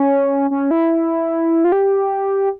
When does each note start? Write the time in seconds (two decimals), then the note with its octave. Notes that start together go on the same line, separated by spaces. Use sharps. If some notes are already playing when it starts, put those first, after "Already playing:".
Already playing: C#4
0.51 C#4
0.71 E4
1.64 F4
1.72 G4